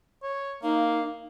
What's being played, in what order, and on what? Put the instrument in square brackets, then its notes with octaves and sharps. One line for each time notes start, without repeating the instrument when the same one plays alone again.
[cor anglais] C#5
[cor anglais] A#3 [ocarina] D#4 [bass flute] F5